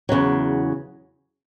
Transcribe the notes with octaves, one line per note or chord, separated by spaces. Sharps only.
E2 C#3 F#3